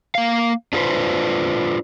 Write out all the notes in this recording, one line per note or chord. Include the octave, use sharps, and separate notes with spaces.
A#3 F5
D4 F4 G#4 A4 B4 C5